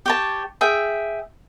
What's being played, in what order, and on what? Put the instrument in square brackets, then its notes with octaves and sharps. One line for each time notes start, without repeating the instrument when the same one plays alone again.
[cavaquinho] G4 C#5 A5
G#4 E5 G5